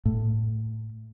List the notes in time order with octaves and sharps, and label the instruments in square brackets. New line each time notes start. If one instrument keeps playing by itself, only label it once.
[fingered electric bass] A2